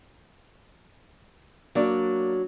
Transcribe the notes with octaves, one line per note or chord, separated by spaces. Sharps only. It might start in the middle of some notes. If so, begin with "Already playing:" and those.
F#3 A#3 D4 D5